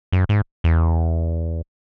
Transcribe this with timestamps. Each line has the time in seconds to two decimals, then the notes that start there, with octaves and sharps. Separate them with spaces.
0.12 F#2
0.29 G#2
0.64 E2